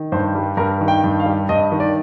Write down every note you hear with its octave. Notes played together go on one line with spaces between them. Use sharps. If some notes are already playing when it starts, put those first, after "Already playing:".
Already playing: D#3
G2 C5
G3
G2 A#4
D#3
G5
G2
F5
G3
G2 D#5
D#3
D5